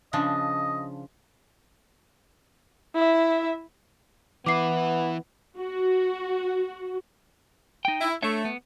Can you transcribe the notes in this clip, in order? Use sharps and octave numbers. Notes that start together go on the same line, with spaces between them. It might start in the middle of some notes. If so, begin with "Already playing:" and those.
C#3 F3 D4 D#5
E4 E5
E3 B3 E4 D6 C7
F#4
D#4 G5
E4
A3 D4 C#5 E5
B3